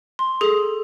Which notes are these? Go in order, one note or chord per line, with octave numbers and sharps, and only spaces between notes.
C6
G#4 A4